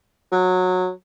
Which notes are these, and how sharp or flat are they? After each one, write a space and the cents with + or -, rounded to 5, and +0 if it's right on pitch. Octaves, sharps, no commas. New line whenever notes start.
F#3 -15